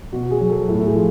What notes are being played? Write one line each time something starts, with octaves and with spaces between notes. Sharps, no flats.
B2 F#4
G#4
F#3
A4
A2 A4
G#4
F3